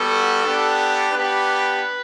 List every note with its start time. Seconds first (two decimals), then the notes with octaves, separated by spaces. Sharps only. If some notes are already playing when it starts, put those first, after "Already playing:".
Already playing: G3 B3 F#4 A4
0.43 B3 D4 G4
1.12 B3 D4 G4 B4